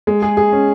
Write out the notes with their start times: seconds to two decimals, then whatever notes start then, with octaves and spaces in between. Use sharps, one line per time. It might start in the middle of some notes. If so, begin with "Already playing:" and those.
0.07 G#3
0.22 G#4
0.37 G#4
0.52 C#4